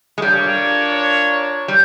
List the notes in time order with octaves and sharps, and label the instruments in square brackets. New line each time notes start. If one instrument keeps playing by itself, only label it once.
[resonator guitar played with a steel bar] G#3
[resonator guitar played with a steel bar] G3 [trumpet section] D4 F4 A#4 C#5
[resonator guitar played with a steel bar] G3